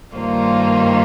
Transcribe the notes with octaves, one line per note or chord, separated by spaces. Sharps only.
G2 D#3 A#3 F4 C5